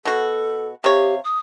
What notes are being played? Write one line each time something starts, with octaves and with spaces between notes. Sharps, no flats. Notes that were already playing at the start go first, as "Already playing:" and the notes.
B2 F#4 A4
C3 G4 C#5 F5
D#6